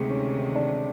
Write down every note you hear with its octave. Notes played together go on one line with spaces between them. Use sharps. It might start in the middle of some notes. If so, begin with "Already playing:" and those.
Already playing: D2 C3 D#3 G#3
C#4
D4